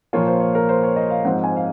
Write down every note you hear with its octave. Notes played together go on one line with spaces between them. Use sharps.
A#2 F3 A#3 F4 C#5
C5
C#5
A#4
C5
C#5
D#5
F5
G#2 F3 C4 F#5
G#5
F5